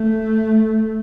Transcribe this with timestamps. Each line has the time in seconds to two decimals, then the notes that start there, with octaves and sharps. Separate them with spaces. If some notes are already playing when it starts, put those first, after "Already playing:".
Already playing: A3